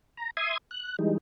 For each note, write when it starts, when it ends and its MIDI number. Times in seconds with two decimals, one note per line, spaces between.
0.17 0.31 82
0.37 0.57 76
0.37 0.57 84
0.37 0.57 87
0.37 0.57 92
0.71 0.96 90
0.99 1.18 52
0.99 1.18 55
0.99 1.18 56
0.99 1.18 63